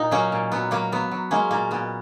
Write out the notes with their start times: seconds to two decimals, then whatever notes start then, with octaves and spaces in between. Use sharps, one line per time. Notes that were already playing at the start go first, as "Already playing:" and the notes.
Already playing: A#2 D#4
0.11 F#3 A#3 C#4
0.32 A#2
0.52 F#3 B3
0.71 F#3 A#3
0.92 F#3 B3
1.11 F#3
1.31 G#3 A#3 C#4
1.51 A#2 A#3
1.71 A#2 B3